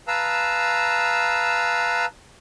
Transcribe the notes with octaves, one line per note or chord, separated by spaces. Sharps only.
B4 F5 A5 A#5 E6